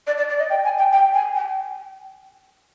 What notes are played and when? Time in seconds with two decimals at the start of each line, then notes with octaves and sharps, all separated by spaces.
0.07 D5
0.18 D5
0.29 D5
0.39 D#5
0.50 G5
0.64 G#5
0.78 G5
0.92 G5
1.14 G#5
1.35 G5